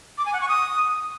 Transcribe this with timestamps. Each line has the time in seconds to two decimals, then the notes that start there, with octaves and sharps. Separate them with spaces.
0.18 D6
0.26 G#5
0.33 F#5
0.41 C#6
0.49 D#6